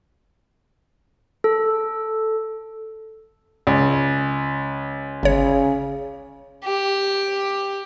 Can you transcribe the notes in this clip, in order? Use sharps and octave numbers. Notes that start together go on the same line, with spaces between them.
A4
C#2
G1 C#3 C#5
G4